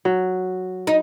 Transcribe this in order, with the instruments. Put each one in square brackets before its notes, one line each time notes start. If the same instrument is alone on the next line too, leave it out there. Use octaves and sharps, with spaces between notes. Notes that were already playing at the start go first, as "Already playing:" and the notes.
[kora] F#3
[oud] D#4